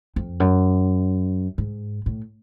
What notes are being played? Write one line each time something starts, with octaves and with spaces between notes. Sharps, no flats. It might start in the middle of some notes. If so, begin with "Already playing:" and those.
F2
F#2
G#2
A2